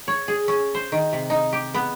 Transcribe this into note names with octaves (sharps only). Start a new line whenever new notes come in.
C#5
G#4
C#4
C5
D#3
C3
D#4
G4
B3